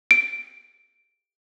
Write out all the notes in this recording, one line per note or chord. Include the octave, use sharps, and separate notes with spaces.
D7